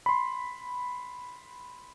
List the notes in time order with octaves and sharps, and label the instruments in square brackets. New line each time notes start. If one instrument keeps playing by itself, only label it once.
[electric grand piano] B5 C6